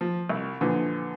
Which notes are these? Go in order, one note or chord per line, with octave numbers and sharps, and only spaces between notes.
F3
C2
A#2 D3 E3 F3